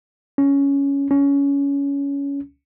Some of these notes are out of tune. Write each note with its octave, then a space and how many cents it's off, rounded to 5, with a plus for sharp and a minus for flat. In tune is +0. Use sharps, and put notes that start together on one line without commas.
C#4 +10
C#4 +20